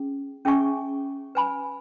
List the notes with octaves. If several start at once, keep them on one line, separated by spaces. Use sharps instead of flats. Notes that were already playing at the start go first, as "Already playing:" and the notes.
Already playing: C#4 G#4
C#4 G#4 E5 G#5 C#6
B4 G#5 B5